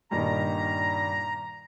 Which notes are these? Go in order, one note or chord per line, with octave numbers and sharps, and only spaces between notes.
G2 A#2 D#3 A#5